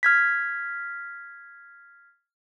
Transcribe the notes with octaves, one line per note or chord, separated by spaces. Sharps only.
F6 G#6 B6